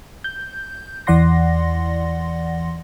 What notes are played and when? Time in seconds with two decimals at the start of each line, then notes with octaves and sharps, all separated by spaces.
0.24 G6
1.07 E2 E3 D5 F#5 C6 A#6